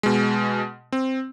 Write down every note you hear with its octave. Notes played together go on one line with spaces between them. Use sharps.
B2 G#3
C4